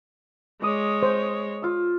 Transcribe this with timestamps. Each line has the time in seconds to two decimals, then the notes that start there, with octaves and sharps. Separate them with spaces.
0.62 G#3 C#5 D5 D#6
1.03 C5
1.62 F4 E6